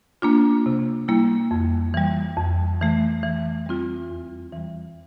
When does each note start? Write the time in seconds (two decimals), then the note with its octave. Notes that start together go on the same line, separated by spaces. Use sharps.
0.22 A#3 D4 F4
0.66 C3
1.08 G3 A#3 E4
1.51 F2
1.94 E3 G3
2.37 F2
2.81 E3 A3
3.23 E3
3.66 G3 C4 F4
4.10 E2
4.52 E3 G3